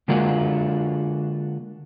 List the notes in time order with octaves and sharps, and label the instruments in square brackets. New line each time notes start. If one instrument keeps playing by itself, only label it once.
[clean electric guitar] D3 G#3 A#3 D4 F4 F#4